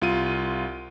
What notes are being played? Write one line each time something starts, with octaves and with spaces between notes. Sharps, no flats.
C2 F4 D#7